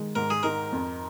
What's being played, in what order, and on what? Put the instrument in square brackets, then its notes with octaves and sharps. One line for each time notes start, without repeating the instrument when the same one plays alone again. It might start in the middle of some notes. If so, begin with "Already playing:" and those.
Already playing: [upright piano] D#3 G#3
[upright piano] G#2 [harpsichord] A#4
[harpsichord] G#4
[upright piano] D#4 [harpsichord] A#4
[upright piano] F2